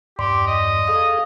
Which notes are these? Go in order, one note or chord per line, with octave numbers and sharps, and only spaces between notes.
E2 G2 G4 D5 C6
D#5
G#4 A4 F5 D#6